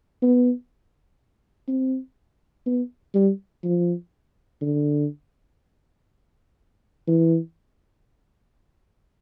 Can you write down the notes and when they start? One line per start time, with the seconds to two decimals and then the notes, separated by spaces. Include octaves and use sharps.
0.22 B3
1.68 C4
2.66 B3
3.15 G3
3.64 F3
4.62 D3
7.08 E3